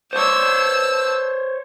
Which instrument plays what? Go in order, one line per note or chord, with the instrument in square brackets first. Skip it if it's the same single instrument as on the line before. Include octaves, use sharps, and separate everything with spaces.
[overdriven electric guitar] C5 C#5 [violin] A5 E6